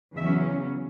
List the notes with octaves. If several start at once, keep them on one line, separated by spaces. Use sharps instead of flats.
E2 C#3 F#3 C#4 E5